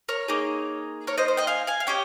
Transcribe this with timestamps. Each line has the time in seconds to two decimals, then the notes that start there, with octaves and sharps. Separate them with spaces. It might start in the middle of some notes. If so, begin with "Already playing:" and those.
0.09 A#4 C#5
0.28 A#3 D#4 G#4
1.07 A#4 C#5
1.18 C5 D#5
1.28 C5
1.37 D#5 G5
1.47 F5 G#5
1.67 F5 G#5
1.80 F5
1.87 C#4 G4 D#5 G5